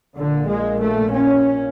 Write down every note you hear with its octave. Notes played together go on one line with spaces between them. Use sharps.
A#1 A#2 D3
G#3
A3
C#4